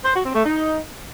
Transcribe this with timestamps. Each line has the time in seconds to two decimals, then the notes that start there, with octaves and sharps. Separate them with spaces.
0.04 C5
0.14 F#4
0.24 C4
0.34 A3
0.44 D#4